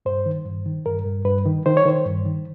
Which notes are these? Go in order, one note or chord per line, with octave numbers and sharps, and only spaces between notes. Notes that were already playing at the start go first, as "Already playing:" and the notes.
G2 C5
D#3
G2
D#3
G2 A#4
G2
G2 B4
D#3
D#3 C5
C#5
D#3 C5
G2
D#3